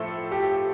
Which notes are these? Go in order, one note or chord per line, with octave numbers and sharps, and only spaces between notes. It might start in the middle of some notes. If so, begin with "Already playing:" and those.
Already playing: A2 F3 A3 A4 C5
G4